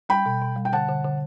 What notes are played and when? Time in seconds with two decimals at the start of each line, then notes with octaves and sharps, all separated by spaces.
0.09 G3 G5 B5
0.26 B2
0.42 B2
0.56 G3
0.65 G5
0.72 D3 F#5 A5
0.88 D3
1.05 D3